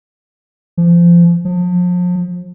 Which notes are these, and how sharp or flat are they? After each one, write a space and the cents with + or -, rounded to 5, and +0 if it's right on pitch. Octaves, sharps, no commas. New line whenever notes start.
F3 -25
F3 +35